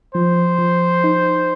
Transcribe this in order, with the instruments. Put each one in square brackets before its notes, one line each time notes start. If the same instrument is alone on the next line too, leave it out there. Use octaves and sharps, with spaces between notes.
[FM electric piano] F3 [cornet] C5
[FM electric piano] F3
D#4